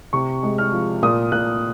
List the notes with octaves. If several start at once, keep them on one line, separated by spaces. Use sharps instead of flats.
C3 C#6
G#3
F6
F3
A#2 D#6
A#2 F#6